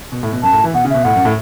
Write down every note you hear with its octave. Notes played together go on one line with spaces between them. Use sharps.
B2
A2
B2
F#2 A5
A2
E3
B2 F#5
C#3
B2 E5
A2 F#5
F#2
A2